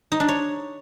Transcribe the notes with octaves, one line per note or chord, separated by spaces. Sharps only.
D#4
D4
C#5